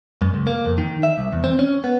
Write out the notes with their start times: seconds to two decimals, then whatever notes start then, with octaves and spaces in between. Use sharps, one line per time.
0.22 F#2
0.34 C#2
0.47 A#3
0.65 F2
0.78 D#3
1.03 E5
1.18 C2
1.33 E2
1.44 C4
1.59 C#4
1.84 B3